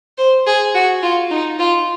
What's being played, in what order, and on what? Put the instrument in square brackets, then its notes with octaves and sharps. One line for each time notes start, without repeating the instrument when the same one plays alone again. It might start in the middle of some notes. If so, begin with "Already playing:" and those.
[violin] C5
G#4
F#4
F4
D#4
F4